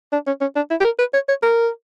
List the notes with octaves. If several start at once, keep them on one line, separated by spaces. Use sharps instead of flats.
D4
C#4
C#4
D4
E4
G4
A#4
B4
C#5
C#5
A#4